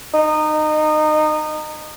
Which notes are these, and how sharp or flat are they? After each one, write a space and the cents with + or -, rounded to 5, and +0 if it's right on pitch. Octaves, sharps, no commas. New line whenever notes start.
D#4 -20